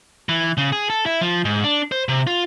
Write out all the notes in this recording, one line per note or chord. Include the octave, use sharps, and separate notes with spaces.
E3
C#3
G#4
A4
E4
F3
G#2
D4
C5
C3
F4